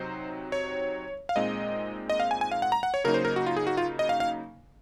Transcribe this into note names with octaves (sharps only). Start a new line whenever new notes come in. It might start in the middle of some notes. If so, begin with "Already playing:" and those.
Already playing: C3 F#3 C4 D#4 C5
C#5
F5
A#2 G#3 C4 D#4 D#5
D#5
F5
G#5
G#5
F5
F#5
A#5
F#5
C#5
C#3 F#3 A#3 D#4 A#4
C5
A#4
F#4
F4
G#4
F#4
F4
D#5
F5
F5